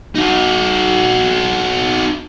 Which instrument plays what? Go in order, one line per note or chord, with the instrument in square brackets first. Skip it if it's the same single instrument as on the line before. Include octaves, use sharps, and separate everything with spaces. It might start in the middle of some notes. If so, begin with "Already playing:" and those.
[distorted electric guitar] D#4 F#4